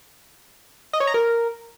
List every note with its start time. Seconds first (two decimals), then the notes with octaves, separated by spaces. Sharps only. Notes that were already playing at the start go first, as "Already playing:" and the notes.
0.93 D#5
1.00 C#5
1.07 A#5
1.14 A#4